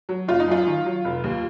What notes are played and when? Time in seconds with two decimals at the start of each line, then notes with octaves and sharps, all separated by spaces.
0.09 F#3
0.28 F#1 F4
0.40 D#4
0.48 F#2 F4
0.67 D#3
0.86 F#3
1.05 F1
1.24 D#2